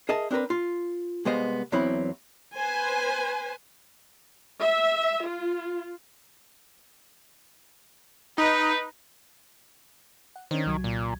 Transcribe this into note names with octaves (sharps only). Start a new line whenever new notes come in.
G#4 A#4 D#5 E5 A5
C4 D4 G4 A#4 B4
F4
C2 G#3 B3 C5 D#5 F5
E2 F#3 B3 C4 E4 B5
B4 C5 G#5
E5
F4
D#4 B4
F#5
D#3 C#4 D4 C5
C2 F#3 G#6
A#2